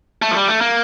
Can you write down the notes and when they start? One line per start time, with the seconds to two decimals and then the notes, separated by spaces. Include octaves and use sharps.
0.22 A3
0.31 F3
0.35 G3
0.48 A3
0.61 A#3